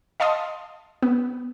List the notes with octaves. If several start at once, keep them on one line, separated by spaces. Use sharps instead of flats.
D#5 F5 A5 C6 D#6
B3